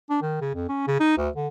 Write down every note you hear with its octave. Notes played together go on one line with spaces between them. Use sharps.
D4
D#3
C#3
F2
C#4
C#3
D#4
D2
D3